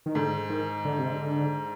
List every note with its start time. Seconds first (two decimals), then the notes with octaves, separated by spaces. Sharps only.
0.06 D#3
0.15 G#2 D3
0.50 D#3
0.85 D3
0.99 C3
1.12 D3